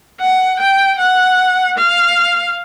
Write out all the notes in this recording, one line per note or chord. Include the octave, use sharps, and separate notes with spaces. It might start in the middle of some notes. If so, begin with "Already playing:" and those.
F#5
G5
F#5
F5